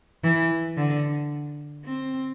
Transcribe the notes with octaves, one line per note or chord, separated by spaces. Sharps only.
E3
D3
C4